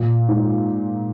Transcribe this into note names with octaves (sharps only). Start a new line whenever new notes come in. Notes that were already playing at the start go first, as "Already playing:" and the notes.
Already playing: A#2
G#2